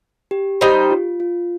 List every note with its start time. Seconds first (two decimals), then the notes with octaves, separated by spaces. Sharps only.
0.31 G4
0.61 G3 D#4 G4 C5
0.91 F4
1.20 F4